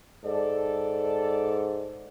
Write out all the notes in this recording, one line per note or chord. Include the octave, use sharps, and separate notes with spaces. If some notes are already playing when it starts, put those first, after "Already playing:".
G#2 A4 D5